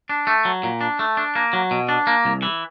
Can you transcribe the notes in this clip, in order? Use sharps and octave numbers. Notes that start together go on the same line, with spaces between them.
D4
A3
F#3
A#2
D4
A3
D4
A#3
F#3
B2
D4
A#3
C2
E3